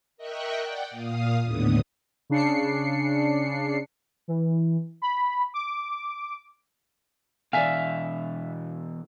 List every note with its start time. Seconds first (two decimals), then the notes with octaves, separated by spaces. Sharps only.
0.17 A#4 D#5 E5 G5 C#6 F#6
0.58 D5 F#5 G5
0.91 A#2 F5 D#6
1.44 D#2 A2 D3 B3 D#6
2.30 C#3 D4 C7 C#7
4.28 E3
5.02 B5
5.54 D6
7.53 B2 E3 D5 E5 F5 G#5